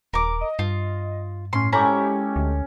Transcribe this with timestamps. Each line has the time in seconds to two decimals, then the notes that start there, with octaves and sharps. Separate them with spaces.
0.13 D#1 A#4 D6
0.41 D#5
0.59 G2 F4
1.53 A2 C#4 C6
1.72 G#3 C#4 E4 G4 A4 C#5 A#5
2.36 D2